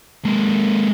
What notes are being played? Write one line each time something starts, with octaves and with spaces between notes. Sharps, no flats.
G#3 A#3